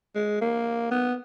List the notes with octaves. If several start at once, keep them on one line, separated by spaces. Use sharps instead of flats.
G#3
A#3
B3